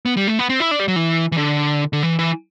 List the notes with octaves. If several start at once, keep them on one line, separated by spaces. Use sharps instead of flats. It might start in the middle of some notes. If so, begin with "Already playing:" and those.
B3
G3
A3
B3
C4
E4
D4
G3
F#3
E3
E3
D3
D3
E3
E3